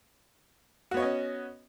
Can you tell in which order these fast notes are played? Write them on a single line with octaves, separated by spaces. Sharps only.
F#4 B3 C#5 D#5 C#4